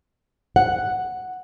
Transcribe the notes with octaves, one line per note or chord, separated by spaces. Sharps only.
F#5